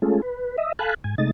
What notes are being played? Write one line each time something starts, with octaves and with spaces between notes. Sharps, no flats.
G#3 A3 C#4 F4 G#4 A4
B4
D#5 E5
A4 F5 G#5 A5 B5 F#6
G#2 G#5
C3 G#3 A3 D#4 D#5 A6